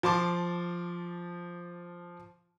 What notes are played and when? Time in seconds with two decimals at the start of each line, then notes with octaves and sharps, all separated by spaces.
0.03 F3 A5 C6 D6